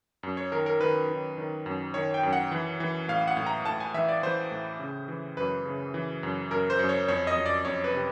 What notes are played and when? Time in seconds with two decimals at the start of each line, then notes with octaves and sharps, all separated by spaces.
0.23 F#2
0.37 C#5
0.52 D#3 A#4
0.66 A#4
0.80 D#3 B4
1.10 D#3
1.38 D#3
1.66 F#2
1.94 D#3 C#5
2.14 G5
2.23 F#2
2.33 F#5
2.52 E3
2.80 E3
3.08 A2 F5
3.28 F#5
3.37 A2
3.46 A#5
3.65 A2 A5
3.80 G#5
3.94 E3 E5
4.08 D5
4.23 E3 C5
4.51 A2
4.79 C#3
5.08 E3
5.37 F#2 B4
5.65 C#3
5.94 E3
6.23 F#2
6.51 F#2 A#4
6.70 C5
6.79 F#2
6.89 C#5
7.08 F2 C#5
7.27 D#5
7.36 F2
7.46 D5
7.65 F2 C#5
7.84 B4
7.93 C3